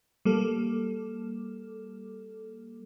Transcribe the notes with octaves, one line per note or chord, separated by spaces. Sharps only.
G3 A#3 A4